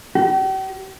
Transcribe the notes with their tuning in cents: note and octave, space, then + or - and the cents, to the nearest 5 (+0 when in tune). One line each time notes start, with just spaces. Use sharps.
G4 -45